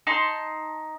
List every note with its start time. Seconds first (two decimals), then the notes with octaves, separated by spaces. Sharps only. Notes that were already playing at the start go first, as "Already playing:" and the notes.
0.07 D#4 A5 C6